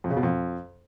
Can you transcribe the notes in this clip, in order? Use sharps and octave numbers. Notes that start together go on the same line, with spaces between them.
F2
C#3
B2
F2